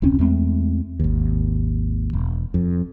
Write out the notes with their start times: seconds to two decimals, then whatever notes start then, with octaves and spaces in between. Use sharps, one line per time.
0.02 E1 C#2 C4 C#4
0.19 E2 G#3 A3 C4
1.00 G#1 D#2
2.13 E1
2.54 F2